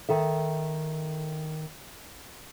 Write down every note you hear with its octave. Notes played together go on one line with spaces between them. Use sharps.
D#3 A4 E5